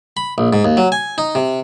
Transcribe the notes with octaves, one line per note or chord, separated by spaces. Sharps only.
B5
A#1
G#2
D#2
F#3
G#5
D#4
C3